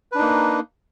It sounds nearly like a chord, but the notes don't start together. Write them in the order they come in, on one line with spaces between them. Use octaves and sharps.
B4 D4 D#4 A#3